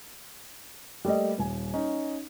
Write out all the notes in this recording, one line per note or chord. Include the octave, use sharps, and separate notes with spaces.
G3 A3 A#3 D5 D#5
D#1 G#5
C#4 D#4